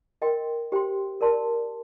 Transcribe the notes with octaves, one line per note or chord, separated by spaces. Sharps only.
A#4 D#5 G5 C6
G4 C5 G5 C6
A#4 D5 A5 C6